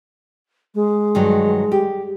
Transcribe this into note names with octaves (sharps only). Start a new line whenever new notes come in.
G#3
G2 D#3 F#3
G4